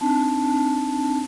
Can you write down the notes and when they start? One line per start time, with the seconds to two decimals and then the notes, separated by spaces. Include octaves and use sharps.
0.01 C4 D4 D#4 A5